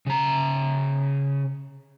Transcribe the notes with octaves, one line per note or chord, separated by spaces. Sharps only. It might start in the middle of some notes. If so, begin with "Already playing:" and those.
C#3 A#5